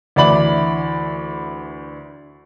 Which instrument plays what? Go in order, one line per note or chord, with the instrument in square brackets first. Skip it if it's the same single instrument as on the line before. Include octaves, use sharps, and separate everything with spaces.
[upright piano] D2 E3 D5 B5 F#7